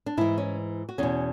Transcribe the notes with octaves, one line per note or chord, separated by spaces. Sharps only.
D4
G#2 E3 E4
C#4
F#4
E2 B2 C#4